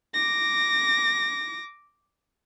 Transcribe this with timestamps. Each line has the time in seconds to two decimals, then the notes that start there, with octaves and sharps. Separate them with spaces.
0.14 D6 A#6